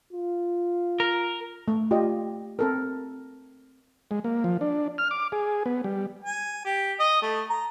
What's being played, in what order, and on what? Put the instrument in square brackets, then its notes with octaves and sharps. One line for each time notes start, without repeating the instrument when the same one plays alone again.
[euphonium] F4
[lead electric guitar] A#4
[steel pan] A3
F4 G4 D5 D#5
C4 A4 A#4
[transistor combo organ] G#3
A#3
F3
D4
F6
D6
G#4
B3
G3
[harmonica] G#5
G4
D#5
A3
A#5